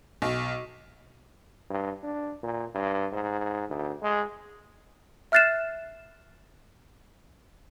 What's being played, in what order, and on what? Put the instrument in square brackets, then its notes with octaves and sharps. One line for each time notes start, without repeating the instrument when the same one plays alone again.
[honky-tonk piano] B1
[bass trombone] G2
D4
A#2
G2
G#2
D2
G#3
[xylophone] E5 F6 F#6 A6 C7 E7